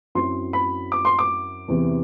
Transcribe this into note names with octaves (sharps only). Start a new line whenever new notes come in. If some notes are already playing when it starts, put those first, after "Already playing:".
F#2 F#3 C4 E4 C6
B5
D6
C6
D6
E2 C3 E3